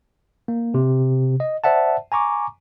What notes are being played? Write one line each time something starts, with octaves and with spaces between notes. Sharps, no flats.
A#3
C3
D#5
C5 D5 E5 F#5 A5
G#5 A#5 C#6 D6